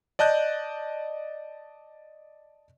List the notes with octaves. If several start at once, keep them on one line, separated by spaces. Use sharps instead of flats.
D5 D#5 A5 F#6 G6